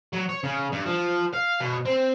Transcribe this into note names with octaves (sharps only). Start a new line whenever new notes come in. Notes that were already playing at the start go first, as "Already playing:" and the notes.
F#3
C#5
C#3
G2
F3
F5
B2
C4